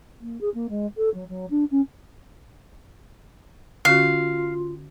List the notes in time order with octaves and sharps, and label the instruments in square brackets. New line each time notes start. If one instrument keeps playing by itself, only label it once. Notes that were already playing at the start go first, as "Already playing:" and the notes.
[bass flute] A#3
G#4
A#3
G#3
A4
F#3
F#3
D4
C#4
[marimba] D3 C#4 F#4 [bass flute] F4 [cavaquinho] F5